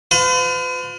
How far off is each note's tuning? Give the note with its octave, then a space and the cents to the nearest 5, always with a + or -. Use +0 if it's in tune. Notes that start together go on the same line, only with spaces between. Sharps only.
F4 +30 B4 +45